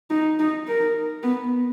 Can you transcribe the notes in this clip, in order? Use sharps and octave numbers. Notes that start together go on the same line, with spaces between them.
D#4
D#4
A#4
B3